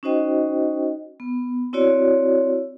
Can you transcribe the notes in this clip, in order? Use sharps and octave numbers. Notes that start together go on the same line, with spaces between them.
C#4 D#4 F#4 C5 D#5 G5
B3
C4 E4 F#4 C#5 D5